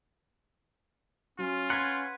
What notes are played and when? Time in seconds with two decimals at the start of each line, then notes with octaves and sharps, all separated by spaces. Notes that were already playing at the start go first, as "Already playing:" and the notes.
1.39 F#3 C#4 F4
1.70 B4 F#5 C6 G#6